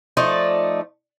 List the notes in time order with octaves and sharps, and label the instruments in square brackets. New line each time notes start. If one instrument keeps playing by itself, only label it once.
[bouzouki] F3 A3 D#4 D5